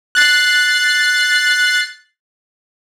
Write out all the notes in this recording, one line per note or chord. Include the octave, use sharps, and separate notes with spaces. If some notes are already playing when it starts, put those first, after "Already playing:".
F#6 A6 C7